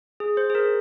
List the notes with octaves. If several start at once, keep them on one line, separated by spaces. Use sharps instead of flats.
G#4
C5
G#4
A#4